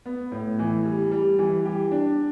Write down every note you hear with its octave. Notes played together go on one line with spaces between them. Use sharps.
B3
A2
E3
G3
G3
E3
G4
D4